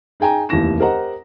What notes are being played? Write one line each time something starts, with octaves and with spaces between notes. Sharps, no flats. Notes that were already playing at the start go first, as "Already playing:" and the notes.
D#4 G#4 G5 G#5 A#5
F1 D#2 E3 E4 A#6 E7
G4 A#4 C5 D#5 F#5 A#5